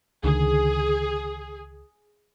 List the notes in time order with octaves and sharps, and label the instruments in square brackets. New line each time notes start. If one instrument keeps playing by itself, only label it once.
[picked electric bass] C#2 D3 D#3 [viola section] G#4